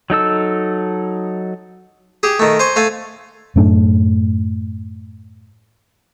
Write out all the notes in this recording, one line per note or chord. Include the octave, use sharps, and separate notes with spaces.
F#3 D#4 A4 E6
G4 G#4
D#3 A3
C5 G#5 C#6
A3 F5 G#5
F#2 A2 A3 D4